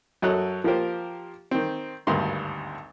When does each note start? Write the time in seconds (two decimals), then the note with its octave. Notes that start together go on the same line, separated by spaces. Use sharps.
0.22 F#2 F#3 A4 C#5 D#5 F#6
0.64 F3 A#3 F4 G4 A#4 C5
1.51 D#3 C4
2.07 G#1 D2 G2 A#3 C6